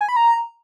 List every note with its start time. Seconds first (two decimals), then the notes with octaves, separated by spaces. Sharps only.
0.01 G#5
0.09 B5
0.16 A#5